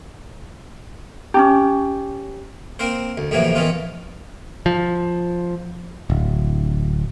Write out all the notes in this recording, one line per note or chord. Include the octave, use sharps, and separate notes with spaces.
C#4 D4 G4
A#3 C4 A#4 C5
D2
F2 A2 C3 E3 F#3 A#3
D#3 E3 B3 C#4 F4
F3
D1